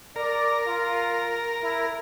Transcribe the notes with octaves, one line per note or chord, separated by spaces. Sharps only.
A#4 D5
F4
E4